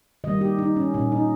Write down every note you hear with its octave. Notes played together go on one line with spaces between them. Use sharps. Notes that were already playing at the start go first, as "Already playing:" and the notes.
D#3 G3 A#3 D#5
G4
D#4
C#4
A#2 A#3 C#4
D#4